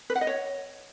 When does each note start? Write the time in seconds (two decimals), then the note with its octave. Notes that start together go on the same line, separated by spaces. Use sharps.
0.10 B4
0.15 F#5
0.21 D#5
0.27 C#5